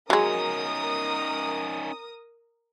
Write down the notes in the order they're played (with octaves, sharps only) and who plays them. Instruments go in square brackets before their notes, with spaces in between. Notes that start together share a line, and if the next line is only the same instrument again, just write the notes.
[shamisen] F#3 G#3 [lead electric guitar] C#4 D#4 [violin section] A#4 D#6